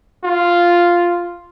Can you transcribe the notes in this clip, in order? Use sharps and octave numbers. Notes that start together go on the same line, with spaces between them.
F4